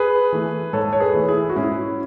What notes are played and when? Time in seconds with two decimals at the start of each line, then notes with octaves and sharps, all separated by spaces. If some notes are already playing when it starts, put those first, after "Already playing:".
Already playing: G#4 B4
0.32 E3 A3
0.73 G#2 A4 C#5
0.93 C#5
1.00 G#4 B4
1.14 E3 A3
1.28 E4 G#4
1.49 F#4
1.56 G#2 C#4 E4